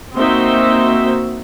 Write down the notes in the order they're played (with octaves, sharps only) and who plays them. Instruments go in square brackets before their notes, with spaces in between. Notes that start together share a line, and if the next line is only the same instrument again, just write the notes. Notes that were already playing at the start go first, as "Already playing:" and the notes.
[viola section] A#3 C4 D#4 F#4 C5 E5